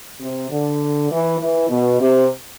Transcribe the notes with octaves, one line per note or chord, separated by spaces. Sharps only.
C3
D3
E3
E3
B2
C3